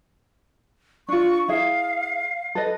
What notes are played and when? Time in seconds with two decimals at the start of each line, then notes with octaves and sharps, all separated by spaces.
1.09 D4 F4 C#6
1.48 E4 G#4 E5 F5
2.55 A4 B4 D#5